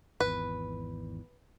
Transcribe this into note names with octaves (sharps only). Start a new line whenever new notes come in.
G#1 E2 B4